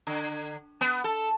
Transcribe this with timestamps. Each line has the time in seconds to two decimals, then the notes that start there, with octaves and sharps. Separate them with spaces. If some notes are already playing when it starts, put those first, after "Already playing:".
0.07 D3
0.81 B3
1.04 A4